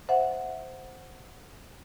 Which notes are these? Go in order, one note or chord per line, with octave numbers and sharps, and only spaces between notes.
C5 E5 F#5